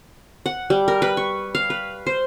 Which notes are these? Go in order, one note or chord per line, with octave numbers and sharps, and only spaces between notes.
F#5
G3
A#4
B4
C#6
F5
B4
C5